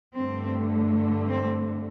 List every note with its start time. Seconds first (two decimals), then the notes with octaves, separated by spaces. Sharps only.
0.16 G2 D3 A3 C4
1.28 C4